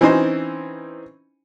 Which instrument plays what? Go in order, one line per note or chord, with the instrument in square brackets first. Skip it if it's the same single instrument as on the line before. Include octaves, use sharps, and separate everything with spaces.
[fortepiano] E3 C4 C#4 D#4 C5